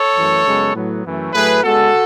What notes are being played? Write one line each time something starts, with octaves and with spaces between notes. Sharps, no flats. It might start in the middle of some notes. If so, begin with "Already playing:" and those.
Already playing: A4 C#5
F#2 E3 A3
F#2 C#3 G#3 B3
A2 F#3 B3
F#2 E3 A3
A2 F#3 A3 G#4 B4
C#3 G#3 B3 F#4 A4